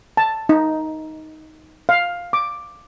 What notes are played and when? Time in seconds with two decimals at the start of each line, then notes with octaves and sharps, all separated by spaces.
0.17 A5
0.49 D#4
1.89 F5
2.33 D6